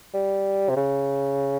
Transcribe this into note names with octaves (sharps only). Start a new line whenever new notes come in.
G3
C3
C#3